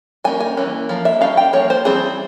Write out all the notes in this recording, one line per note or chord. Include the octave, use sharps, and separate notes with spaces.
G3 A#3 C#4 G#5
G#5
E3 A#3 C#4
F3 A#3
E5
G3 C#4 F5
G5
F3 A#3 C#5
C5
E3 G3 C4 G#4